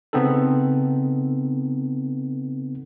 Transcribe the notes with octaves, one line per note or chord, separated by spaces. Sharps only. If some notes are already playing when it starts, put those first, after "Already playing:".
C#3 B3 C4 D#4 A4